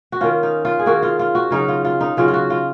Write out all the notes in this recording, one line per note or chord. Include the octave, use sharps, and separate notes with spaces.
F#4
D#3 A#3 C#4 F4
D#4
F4
G#4
D#3 A#3 C#4 F#4
F4
F4
F#4
C#3 F#3 C#4 D#4
F4
F4
D#4
C#3 F#3 C#4 F4
F4
F#4
F4